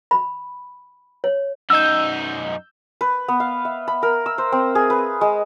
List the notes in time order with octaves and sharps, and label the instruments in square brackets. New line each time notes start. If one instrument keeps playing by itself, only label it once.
[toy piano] B5
C#5
[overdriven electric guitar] F#2 D#4 [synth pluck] E6 G6
[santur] B4
B3
F5
E5
B5
A#4
E6
C5
C4
G#4
B4
G#3